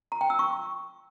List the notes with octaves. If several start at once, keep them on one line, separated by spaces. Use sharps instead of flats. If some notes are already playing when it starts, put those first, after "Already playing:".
A#5
G5
E6
C#6